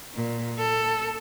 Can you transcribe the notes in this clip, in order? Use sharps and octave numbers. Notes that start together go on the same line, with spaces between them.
A#2
A4